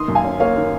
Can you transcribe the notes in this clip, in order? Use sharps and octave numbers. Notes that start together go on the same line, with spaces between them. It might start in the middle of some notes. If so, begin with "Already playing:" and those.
Already playing: D#3 C6 D#6
F#2
F5 G#5
C#4
A#3 C#5 F5
D#3